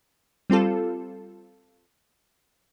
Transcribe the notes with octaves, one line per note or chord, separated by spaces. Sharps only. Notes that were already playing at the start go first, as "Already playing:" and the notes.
G3 C4 F4 A4